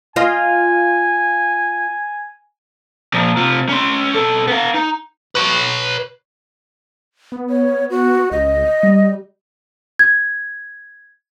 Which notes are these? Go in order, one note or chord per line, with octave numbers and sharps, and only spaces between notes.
F4 D#5 G#5
A#2 F3
C3 F4
C#4 C6
B2 A4
B3 F5
D#4
B4 C#5
B3
C#5
F#4
C#2 D#5
G3
G#6